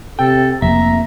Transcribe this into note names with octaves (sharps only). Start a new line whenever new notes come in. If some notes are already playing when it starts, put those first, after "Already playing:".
C3 A4 G5
F1 F2 A#3 E5 A#5